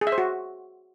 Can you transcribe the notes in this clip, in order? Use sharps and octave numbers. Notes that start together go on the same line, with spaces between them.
G#4
E5
C5
F#4